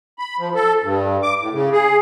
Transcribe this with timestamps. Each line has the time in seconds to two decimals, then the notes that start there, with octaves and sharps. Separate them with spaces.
0.19 B5
0.39 F3
0.55 A4
0.83 G2
1.23 D6
1.40 A2
1.53 C#3
1.72 G#4